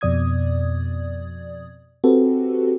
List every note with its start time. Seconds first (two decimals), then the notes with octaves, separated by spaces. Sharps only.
0.01 F2 B2 D5 D#6 G#6
2.04 C4 F#4 G4 A4 B4